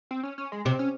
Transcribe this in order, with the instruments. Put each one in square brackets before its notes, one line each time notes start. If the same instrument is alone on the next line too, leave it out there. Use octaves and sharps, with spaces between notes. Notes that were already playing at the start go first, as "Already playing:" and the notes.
[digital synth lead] C4
C#4
C#4
G#3
[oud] C3 [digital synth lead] C4
[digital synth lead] C#4